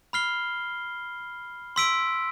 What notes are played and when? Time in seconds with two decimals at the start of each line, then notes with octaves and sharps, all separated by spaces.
0.13 B5 F6 C7 G7
1.76 C6 E6 B6 D7